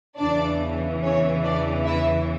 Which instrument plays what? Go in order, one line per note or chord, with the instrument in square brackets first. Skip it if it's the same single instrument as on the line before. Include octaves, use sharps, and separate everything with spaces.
[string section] E2 C#3 E3 D4 D5
C#4 C#5
D4 D5
E4 E5